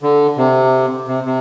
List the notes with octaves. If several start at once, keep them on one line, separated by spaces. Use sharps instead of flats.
D3
C3
C3
C3